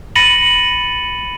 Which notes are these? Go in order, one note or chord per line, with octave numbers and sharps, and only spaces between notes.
B5 A6 A#6 C#7 D#7 F#7